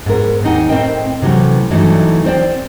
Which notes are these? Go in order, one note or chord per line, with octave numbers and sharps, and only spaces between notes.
G#2 B3 A#4
D#2 C4 D#4 F#5 G#5
A2 C4 A#4 D#5 G5
C3 E3 F#3 A3 C#4
G2 E3 F#3 A3 D#4
C4 C5 D5 G5